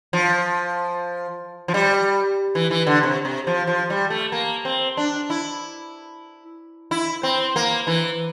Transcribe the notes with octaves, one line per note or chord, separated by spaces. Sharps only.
F3
F3
G3
E3
E3
D3
C3
C3
F3
F3
G3
A3
A#3
C4
D4
E4
E4
C4
A#3
E3